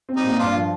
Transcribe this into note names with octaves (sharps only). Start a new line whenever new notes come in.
C4
G3 D#4
A#2
G2 D4 F4
F3